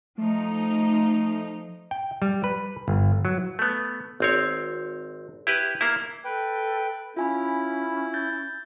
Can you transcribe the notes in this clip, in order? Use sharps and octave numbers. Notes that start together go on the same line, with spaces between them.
F3 A3 D#4
G5
G3
B4
G1
F#3
A3 B3
G#1 C4 C#5
E4 G4 B4
A#3 E4
A4 B4 G5
C#4 E4 F4 G#5 B5
G6 A6